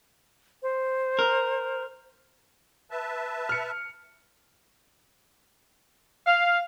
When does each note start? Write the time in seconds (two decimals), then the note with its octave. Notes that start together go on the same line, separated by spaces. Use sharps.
0.63 C5
1.19 A#4
2.91 B4 E5 A5
3.49 F6 C#7
6.27 F5